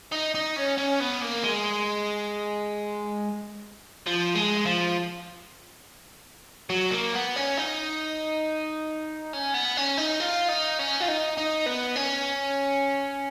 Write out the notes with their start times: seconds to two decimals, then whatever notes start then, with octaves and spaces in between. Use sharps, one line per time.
0.12 D#4
0.34 D#4
0.56 C#4
0.78 C#4
1.00 B3
1.21 A#3
1.44 G#3
4.07 F3
4.35 G#3
4.66 F3
6.70 F#3
6.91 A#3
7.14 B3
7.36 C#4
7.57 D#4
9.33 C#4
9.54 B3
9.77 C#4
9.98 D#4
10.20 F4
10.49 D#4
10.79 C#4
11.01 F4
11.08 D#4
11.37 D#4
11.66 B3
11.96 C#4